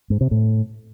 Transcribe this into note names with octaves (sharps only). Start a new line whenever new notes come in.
G#2
C3
A2